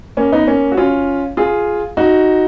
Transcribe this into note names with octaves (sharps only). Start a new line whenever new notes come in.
A#3 C#4
B3 D#4
A#3 C#4
F#4
C#4 F4
F4 G#4
D#4 F#4